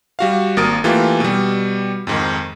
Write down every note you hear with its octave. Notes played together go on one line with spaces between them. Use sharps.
G3 F#4 F5
G#1 A#3 A#4 D#6 A6 D7
E3 A3 A#3 F4 G4
B2 G3
F2 G#2 D#3